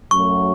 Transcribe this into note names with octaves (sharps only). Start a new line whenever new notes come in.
F#2 F#3 A3 C#6